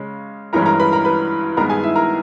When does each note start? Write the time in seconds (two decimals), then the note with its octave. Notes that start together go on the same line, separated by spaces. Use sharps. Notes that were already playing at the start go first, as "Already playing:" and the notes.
Already playing: C#3 G#3 C#4
0.53 G2 E3 G#3 C#4 A#4 A#5
0.62 B5
0.66 A#4 A#5
0.80 B4 B5
0.92 A#4 A#5
1.05 B4 B5
1.57 G2 D#3 G#3 B3 A#4 A#5
1.70 G#4 G#5
1.83 E4 E5
1.96 A#4 A#5